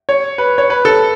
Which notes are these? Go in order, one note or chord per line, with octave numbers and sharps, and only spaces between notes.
C#5
B4
C#5
B4
A4